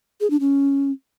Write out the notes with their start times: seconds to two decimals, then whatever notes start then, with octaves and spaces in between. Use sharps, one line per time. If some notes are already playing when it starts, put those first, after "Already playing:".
0.21 G#4
0.30 D4
0.40 C#4